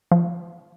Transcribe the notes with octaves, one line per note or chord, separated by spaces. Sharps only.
F3